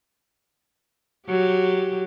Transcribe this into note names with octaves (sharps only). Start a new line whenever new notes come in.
F#3 G4